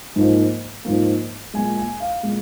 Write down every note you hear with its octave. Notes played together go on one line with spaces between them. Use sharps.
G#2 F3 A#3
G#2 F3 A#3
A#2 G#3 G#5
G#5
F5
A#2 G#3